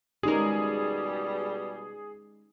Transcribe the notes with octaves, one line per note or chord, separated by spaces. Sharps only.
B2 G3 G#3 C#4 D#4 G4 G#4 A#4